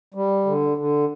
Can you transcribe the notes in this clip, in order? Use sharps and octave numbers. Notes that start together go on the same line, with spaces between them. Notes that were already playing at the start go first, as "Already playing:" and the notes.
G3
D3
D3